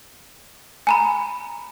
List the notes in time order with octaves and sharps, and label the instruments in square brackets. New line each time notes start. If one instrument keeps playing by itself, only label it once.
[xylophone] G#5 A#5 B5